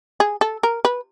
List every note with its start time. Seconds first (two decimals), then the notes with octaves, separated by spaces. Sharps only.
0.20 G#4
0.41 A4
0.63 A#4
0.85 B4